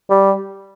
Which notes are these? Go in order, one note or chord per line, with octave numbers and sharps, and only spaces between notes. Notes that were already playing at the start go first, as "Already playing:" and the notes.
G3